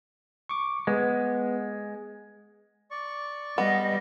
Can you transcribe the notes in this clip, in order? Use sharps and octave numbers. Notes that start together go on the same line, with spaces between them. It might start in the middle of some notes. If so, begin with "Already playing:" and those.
C#6 D6
G#3 B3
D5 C#6
G3 B3 D#5